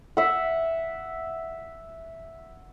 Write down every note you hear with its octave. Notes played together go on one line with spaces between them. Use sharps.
E5 F#5